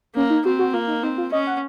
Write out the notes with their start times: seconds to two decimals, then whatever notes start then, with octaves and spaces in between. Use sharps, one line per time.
0.15 A#3 C#4
0.30 D#4
0.45 C4 F#4
0.59 F#4
0.73 A#3 F4
0.88 D#4
1.03 C4 D#4
1.18 F4
1.32 C#4 D#5
1.47 F#5